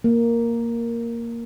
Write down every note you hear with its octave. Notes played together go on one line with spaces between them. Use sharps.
A#3